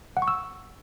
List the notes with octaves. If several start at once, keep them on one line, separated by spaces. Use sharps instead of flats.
F#5
C#6
E6